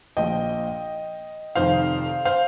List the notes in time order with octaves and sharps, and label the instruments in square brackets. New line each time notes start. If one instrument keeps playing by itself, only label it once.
[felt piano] A#1 A#2 F3 D#5 G5
F1 F2 D#3 C5 F5
C5 F5